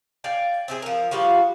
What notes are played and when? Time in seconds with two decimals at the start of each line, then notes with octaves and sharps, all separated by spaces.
0.24 D5 F5 G5 G#5
0.68 C4 E4 G#4
0.82 F3 A#4
1.11 F3 G3 F4 F#4